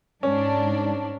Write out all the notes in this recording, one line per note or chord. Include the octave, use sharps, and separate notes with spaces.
G#2 C#4 D4